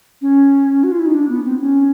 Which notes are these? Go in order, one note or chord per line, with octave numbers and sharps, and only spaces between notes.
C#4
F#4
F4
E4
D#4
D4
B3
C4
C#4